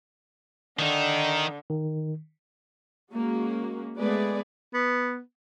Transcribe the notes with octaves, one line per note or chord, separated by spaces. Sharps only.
D3 D#3 D#4
D#3
G#3 A#3 C#4 F#4
G#3 A3 B3 G#4 B4 D5
B3